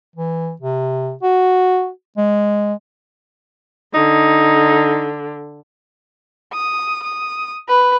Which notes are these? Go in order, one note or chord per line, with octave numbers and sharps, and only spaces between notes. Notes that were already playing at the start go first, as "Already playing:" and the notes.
E3
C3
F#4
G#3
D3 D#4
D#6
D#6
B4